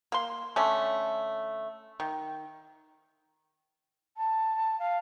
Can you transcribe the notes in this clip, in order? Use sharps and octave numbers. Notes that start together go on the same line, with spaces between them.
A#3 C6
D3 A3 C#4
D#3
A5
F5